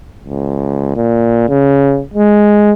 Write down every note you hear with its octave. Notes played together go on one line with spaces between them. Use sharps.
C#2
A#2
C#3
G#3